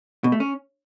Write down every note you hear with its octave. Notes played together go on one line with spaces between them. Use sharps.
B2
A3
C#4